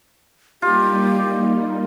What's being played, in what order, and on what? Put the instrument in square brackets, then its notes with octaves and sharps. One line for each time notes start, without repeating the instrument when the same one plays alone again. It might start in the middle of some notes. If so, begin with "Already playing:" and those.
[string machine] G3 A#3 D#4 [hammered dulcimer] F4 [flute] G4